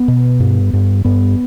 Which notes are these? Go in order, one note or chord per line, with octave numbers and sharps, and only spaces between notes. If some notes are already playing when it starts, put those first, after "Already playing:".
Already playing: B3
B2
G2
G2
G2 B3